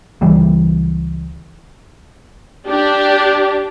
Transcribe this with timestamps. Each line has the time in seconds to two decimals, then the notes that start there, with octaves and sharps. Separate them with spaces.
0.21 C#2 E3 G3
2.68 D4 G4